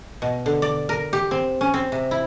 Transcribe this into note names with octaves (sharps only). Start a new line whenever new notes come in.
B2
D3
D5
A#4
G4
C4
C#4
C4
C3
E4